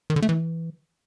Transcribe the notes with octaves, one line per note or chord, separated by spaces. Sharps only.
D#3
D3
A3
E3